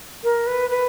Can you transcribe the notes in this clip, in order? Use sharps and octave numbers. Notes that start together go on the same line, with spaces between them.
A#4
B4
B4